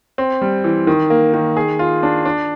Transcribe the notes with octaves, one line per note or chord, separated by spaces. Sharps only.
C4
G3
E3
D#3
A#3
D#3
G#4
F4
D4
D4